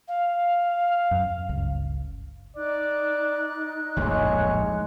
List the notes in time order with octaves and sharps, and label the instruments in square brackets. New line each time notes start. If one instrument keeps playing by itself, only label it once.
[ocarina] F5
[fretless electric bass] F#2 F#3
G1 C#2
[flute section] D#4 F#6 [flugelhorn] D5
[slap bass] D1 A#1 F2 [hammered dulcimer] G#3 [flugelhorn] C#5